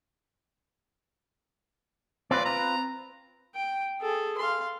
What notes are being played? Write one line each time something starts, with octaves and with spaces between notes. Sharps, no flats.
C4 F4 B4 D5
A#5
G5
G#4 A4
F5 C6